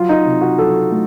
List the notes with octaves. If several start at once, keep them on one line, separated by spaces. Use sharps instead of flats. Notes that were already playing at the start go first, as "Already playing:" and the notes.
Already playing: F#3 F4
D#4
C3
F#4
F#3 A4
A3